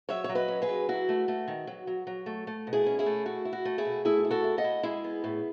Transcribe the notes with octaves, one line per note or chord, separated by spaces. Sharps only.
F#3 C#5 E5
F#3 C#5
B4 D#5
C#4
G#4 B4
F#3
E4 F#4
A3
A3
D#3
F#3
F#3
F#3
A3
A3
B2
E4 G#4
C#4
E4 G#4
A3
E4 F#4
E4
F#4
A3
E4 G#4
B2
A3 E4 G#4
E4
F#4 A4
E4
D#5 F#5
E4
G#3 E4 G#4
B3
A2